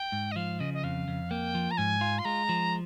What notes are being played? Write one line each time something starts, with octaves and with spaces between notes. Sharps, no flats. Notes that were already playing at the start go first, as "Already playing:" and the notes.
Already playing: G5
G#2
D#5
F3 F5
C#3 D#5
D#5
F2 F5
F2
A#3 G5
F3
A#5
G#2 G#5
F4
C6
G#3 A#5
F3